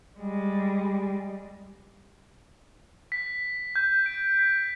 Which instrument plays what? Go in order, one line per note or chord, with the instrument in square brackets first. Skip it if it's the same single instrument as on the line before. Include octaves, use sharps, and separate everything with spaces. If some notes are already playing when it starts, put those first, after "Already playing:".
[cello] G3 G#3
[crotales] B6
G6
D7
B6